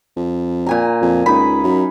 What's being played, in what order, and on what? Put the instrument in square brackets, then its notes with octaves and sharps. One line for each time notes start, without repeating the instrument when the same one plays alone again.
[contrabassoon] F2
[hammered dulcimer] A#2 G#5 A#5
[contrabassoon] F2
[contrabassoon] C#2 [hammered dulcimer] D#4 B5
[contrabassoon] F#2